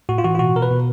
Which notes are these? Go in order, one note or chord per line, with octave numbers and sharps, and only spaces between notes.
A2 F#4
F4
E3 F#4
F4
B2 F#4
B2 A#4
B4
B2